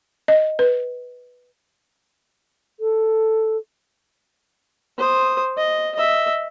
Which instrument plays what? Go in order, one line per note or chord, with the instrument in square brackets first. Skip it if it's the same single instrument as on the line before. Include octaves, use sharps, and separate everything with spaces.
[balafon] D#5
B4
[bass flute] A4
[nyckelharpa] C5 D#6
D#5
D#5 E5